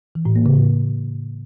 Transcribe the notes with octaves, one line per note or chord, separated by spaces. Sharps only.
E3
A2
A#3
C#3
A2